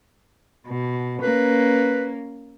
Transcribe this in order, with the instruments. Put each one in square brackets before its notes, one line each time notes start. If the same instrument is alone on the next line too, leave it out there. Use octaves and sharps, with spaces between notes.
[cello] B2
[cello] A#3 C#4 [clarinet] B4